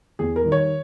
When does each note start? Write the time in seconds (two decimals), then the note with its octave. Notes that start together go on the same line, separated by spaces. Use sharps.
0.19 E2 G#4
0.36 A#4
0.43 D#3 G3
0.52 C#5